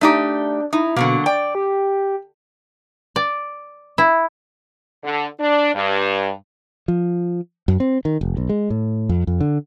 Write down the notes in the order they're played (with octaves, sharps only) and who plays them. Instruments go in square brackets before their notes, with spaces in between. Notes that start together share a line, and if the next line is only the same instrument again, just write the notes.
[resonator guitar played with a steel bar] A3 D#4 G4 [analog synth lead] D4
[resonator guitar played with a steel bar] D#4 [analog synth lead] E4
[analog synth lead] B2 [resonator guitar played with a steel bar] D3 F#3 A#3
[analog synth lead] D5 [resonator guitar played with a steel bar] G5
[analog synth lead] G4
[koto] D5
E4
[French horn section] D3
D4
G2
[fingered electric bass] F3
F#2
C4
D#3
F1
B1
G#3
A2
F2
F2
D3